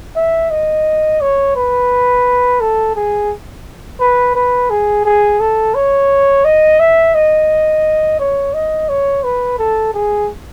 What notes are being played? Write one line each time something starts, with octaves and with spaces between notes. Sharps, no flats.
E5
D#5
C#5
B4
A4
G#4
B4
B4
G#4
G#4
A4
C#5
D#5
E5
D#5
C#5
D#5
C#5
B4
A4
G#4